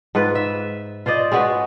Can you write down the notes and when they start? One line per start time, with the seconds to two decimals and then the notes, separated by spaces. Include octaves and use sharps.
0.15 G#2 F4 B4
0.35 E5
1.06 F4 C5 D5 D#5
1.32 G#3 C#4 F#4 B4